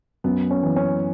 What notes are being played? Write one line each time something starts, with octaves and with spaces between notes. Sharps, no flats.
F#2 B3
C#4
E3
C#4